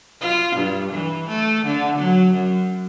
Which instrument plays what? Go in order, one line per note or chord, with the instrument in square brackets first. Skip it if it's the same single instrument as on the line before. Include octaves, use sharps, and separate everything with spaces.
[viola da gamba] F4
G2
E3
A3
D3
F#3
F#2